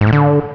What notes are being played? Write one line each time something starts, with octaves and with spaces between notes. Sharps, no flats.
G#2
A2
D3